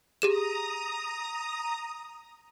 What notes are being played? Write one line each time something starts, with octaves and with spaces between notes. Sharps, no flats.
G4 G#4 A#5 D#6 E7